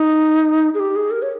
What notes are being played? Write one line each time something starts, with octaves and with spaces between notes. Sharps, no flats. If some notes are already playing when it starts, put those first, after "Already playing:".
Already playing: D#4
G#4
G4
G#4
A#4
C#5